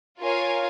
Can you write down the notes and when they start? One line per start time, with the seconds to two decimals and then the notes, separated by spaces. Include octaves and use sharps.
0.19 F4 A#4 C#5 F5 G#5